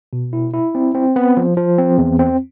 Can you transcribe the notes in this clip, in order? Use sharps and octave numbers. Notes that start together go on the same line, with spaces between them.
B2
E4
E4
C4
C4
B3
F3
F3
C4
E2
C4